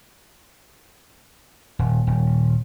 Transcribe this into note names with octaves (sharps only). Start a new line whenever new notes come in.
D#1
D#1